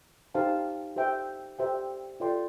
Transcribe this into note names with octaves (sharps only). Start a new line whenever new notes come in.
D#4 G4 C5 F5 A5
G4 C5 E5 G5
G4 C5 E5 G5
F4 A4 D5 G5 C6